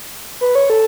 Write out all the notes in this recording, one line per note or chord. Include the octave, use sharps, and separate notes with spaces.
B4
C#5
A4